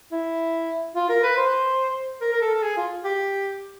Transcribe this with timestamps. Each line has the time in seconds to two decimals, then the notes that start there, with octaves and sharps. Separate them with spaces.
0.12 E4
0.95 F4
1.09 A#4
1.23 B4
1.37 C5
2.21 A#4
2.33 A#4
2.42 A4
2.54 A4
2.62 G#4
2.77 F4
3.05 G4